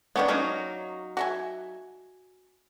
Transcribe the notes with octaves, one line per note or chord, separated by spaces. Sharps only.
D#3 B3 C#4 D4 C#5
F#3 A#3 C#4 D#4 C#5
F#4 E5 G#5